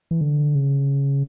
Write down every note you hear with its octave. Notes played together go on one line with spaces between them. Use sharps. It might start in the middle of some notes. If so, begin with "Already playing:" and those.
E3
D3
C#3